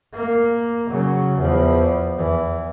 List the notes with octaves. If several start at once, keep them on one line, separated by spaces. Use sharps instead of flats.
A#3
C#3 F#3
E2 F3
E2 E3